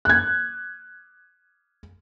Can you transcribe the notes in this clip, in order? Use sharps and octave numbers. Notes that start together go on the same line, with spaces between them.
F#6 G#6